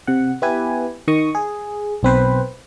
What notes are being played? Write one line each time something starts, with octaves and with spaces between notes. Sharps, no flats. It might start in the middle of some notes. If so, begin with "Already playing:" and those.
C3 F#5
B3 E4 G4 B4 G#5
D#3 D#5 C#6 D#6
G#4
B1 C4 B4 C5